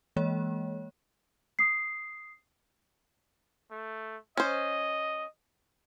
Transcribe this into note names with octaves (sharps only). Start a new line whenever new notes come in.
E3 G#3 A#3 C#5
D#6 C7
A3
C#4 C5 D#5